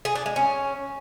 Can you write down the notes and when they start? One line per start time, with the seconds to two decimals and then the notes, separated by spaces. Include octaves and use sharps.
0.05 G#4
0.15 D4
0.26 G#3
0.36 C#4